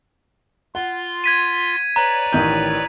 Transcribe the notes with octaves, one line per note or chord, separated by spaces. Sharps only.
F4 F#5 C6
G#6 B6 D#7
B4 C#5 D5 A#5
A1 D#3 G6